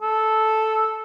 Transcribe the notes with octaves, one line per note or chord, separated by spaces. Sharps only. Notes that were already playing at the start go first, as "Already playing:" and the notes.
A4